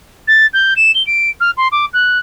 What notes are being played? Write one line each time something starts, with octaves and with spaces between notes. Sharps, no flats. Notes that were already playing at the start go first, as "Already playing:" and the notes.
A6
G6
E7
G7
D7
F6
C6
D6
F#6